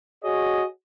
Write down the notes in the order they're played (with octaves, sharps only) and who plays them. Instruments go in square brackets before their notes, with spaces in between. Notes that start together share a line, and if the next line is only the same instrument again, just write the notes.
[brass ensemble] F#4 G#4 C#5 D#5